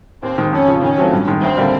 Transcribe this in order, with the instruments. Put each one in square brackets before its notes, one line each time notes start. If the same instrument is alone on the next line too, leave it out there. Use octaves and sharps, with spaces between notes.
[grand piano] D#2 [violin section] C4
[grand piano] D#3 G#3
[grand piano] F2 [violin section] C#4
[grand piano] C#3 F3
[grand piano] D#3 [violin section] C#4
[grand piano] F#3 A3 C4 F4
G2
D#3 G#3
[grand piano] D2 [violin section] C4
[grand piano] D3 G3 A#3